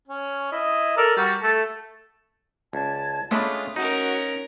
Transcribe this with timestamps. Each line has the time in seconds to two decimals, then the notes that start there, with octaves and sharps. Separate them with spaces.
0.07 C#4
0.52 E4 D#5
0.97 A4 A#4 D5
1.17 G3 F#4
1.43 A3 A5
2.73 C#2 D5 A5 G#6
3.31 G#3 A3 C#4 D4 F4 B5 D#6
3.76 C#4 D#4 F#4 A#4